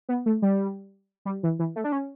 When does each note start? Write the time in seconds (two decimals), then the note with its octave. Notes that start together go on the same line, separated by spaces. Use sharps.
0.09 B3
0.26 A3
0.42 G3
1.25 G3
1.43 E3
1.59 E3
1.76 A3
1.84 D4
1.92 C#4